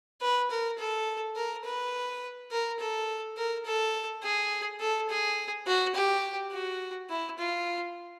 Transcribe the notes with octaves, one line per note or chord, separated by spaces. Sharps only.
B4
A#4
A4
A#4
B4
A#4
A4
A#4
A4
G#4
A4
G#4
F#4
G4
F#4
E4
F4